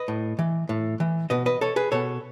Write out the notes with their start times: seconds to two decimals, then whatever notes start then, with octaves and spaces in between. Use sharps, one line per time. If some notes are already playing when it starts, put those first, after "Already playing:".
Already playing: B4 D#5
0.08 A2
0.39 E3
0.69 A2
1.00 E3
1.30 B2 B4 D#5
1.46 B4 D#5
1.61 A4 C#5
1.76 G#4 B4
1.92 B2 A4 C#5